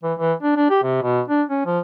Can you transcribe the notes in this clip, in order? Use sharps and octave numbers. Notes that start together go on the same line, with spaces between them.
E3
E3
D4
D4
G4
C3
B2
D4
C#4
F3